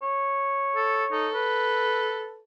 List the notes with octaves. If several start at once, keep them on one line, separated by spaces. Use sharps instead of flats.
C#5
A4
D#4 A4
B4